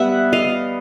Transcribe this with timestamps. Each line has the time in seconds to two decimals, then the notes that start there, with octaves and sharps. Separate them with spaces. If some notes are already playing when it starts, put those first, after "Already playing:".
Already playing: G3 B3 E5 F#5
0.33 D#5 F5